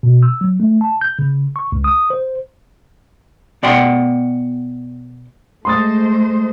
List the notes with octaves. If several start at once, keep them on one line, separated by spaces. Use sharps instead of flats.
B2
E6
F#3
A3
A5
G6
C#3
C#6
C#2
D#6
C5
B2 D5 F#5 G5 C6
G#3 A3 C5 C6 D#6 A6